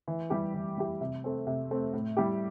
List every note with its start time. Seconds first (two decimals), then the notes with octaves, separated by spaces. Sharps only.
0.08 E3
0.30 G3 E4 G4
0.54 E3
0.78 G3 E4 G4
1.01 C3
1.24 A3 C4
1.47 C3
1.71 A3 C4
1.93 A2
2.17 G3 E4 G4